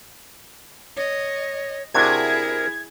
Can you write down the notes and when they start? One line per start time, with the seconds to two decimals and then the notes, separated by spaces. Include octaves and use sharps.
0.97 C#5 D#5
1.94 C3 D4 E4 F#4 G#4 A#4 G#6